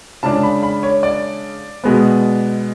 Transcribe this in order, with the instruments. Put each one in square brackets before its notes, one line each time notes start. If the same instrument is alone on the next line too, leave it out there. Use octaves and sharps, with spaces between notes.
[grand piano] C#3 G#3 D4 A5
B5
B5
C#5
D5
B2 G#3 B3